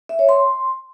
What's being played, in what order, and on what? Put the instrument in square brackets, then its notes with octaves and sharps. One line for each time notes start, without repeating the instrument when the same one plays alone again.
[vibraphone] E5
C#5
C6